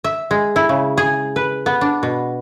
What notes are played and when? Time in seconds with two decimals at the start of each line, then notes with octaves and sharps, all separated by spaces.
0.04 E5
0.31 G#3
0.56 E4
0.69 C#3
0.98 G#4
1.36 B4
1.66 B3
1.81 D4
2.03 B2